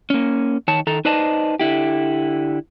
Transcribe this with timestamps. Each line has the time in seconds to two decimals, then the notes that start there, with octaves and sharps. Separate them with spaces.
0.10 A#3 C#4
0.68 D#3 C#5 A5
0.87 D#3 A4 A#5
1.05 D#4 B4 C5 D5 D#5 A5
1.60 D3 E4 G4